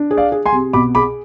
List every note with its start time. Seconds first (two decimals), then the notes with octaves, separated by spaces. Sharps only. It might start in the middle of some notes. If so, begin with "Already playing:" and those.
Already playing: D4
0.11 G#4
0.17 D5 F5
0.32 G#4
0.46 G#5 C6
0.52 C3
0.73 B2 B5 D6
0.95 G#4 B5 D6